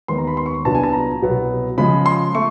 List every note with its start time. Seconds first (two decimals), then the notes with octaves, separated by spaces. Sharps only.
0.08 D#2 D#3 G#3 B3 C6
0.18 A#5
0.27 B5
0.37 C6
0.46 C#6
0.65 C2 A#2 F#3 B3 D4 A5
0.75 G#5
0.83 A5
0.93 A#5
1.22 C2 B2 F#3 B3
1.78 C#3 F3 G#3 B5
2.06 C6
2.35 A3 C#6